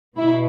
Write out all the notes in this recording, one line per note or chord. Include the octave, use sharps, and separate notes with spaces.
B2 B3 E4